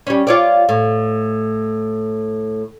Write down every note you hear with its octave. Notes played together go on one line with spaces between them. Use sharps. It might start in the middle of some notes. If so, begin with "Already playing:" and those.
G3 C#4
F4 C#5 D5
A2